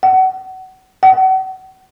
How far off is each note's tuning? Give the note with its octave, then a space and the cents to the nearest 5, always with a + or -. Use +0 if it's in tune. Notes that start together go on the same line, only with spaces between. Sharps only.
F#5 +25
F#5 +35